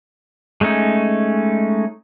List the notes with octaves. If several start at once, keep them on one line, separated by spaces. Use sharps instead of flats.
G#3 A3 C#4 D#4